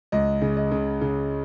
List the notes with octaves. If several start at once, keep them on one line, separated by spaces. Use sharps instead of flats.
C#2 D#5
C#3
D#5
C#3
C#3